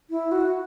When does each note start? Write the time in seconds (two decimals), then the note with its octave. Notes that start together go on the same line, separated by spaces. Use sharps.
0.10 E4
0.32 F#4